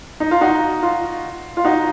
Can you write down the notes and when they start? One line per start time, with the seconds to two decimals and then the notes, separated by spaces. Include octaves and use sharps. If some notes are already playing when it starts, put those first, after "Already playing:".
0.20 D#4
0.31 F4
0.41 D#4 F#4
0.83 F4
1.57 F4
1.64 D#4 F#4